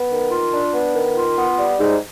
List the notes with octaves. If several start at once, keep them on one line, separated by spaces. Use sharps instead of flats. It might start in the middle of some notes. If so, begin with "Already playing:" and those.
Already playing: B3
D#3
F4
D4
B3
D#3
F4
B3
G3
G#2